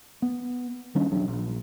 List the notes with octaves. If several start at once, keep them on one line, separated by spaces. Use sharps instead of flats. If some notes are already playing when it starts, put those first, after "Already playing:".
B3
D#3 G3 C#4 D4
E1 B1 F#3 D4
A#1